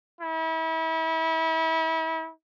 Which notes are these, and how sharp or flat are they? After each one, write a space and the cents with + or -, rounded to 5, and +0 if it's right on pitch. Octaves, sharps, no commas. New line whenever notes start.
E4 -35